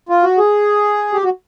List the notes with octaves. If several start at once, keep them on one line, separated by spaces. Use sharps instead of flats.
F4
F#4
G#4
G4
F#4